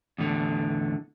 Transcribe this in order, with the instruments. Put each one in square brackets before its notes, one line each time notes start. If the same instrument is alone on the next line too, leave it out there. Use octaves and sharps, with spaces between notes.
[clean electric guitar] E2 A2 D3